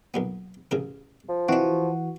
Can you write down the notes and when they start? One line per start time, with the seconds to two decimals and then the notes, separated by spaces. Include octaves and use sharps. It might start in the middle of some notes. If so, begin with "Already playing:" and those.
0.14 B1 A#2 B3
0.71 A1 C#3 A#4
1.29 F3
1.49 E3 C4 D4 F#4